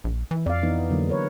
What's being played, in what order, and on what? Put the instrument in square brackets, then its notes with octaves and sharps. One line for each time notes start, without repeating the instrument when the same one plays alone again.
[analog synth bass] A#1
E3
[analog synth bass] F2 [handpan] D5 F5
[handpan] E3 B3 D#4
D3 F#3 A#3
A#4 B4 C#5